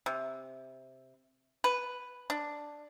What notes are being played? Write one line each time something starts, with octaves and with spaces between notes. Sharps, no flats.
C3
B4
D4